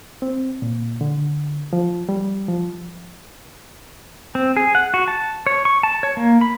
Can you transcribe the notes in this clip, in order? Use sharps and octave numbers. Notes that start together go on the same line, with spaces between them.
C4
A#2
D3
F3
G3
F3
C4
G#4
F#5
F#4
A5
C#5
C#6
A5
C#5
A#3
B5